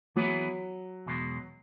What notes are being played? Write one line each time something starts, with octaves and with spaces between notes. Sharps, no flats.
E3 F#3 B3 E4 G#4 B4
E2 B2 G#3